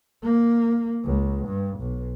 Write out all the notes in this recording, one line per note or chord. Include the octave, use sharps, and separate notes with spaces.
A#3
C#2
G2
B1